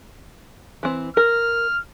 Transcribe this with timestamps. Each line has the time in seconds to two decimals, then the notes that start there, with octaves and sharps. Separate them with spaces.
0.83 E3 C4
1.17 A#4 F6